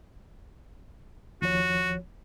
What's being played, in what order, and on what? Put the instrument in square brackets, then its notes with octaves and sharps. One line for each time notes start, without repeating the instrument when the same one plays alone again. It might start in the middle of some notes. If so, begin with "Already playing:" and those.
[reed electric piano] D#2 F3 C#5 [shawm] F#4